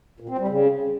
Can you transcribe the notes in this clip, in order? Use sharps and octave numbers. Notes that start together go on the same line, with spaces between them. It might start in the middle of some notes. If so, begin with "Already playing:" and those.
A#2
C4
G3
C#3